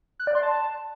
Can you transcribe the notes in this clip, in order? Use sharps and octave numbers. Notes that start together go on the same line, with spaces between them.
F#6
D5
C6
A5